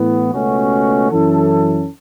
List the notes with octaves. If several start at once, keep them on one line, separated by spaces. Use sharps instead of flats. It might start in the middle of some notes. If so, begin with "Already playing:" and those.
Already playing: A2 E3 B3
C#2 B2 A3 C#4 F#4
F#2 E3 C#4 E4 A4